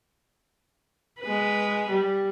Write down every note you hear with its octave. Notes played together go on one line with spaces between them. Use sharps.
G#3 B4
G3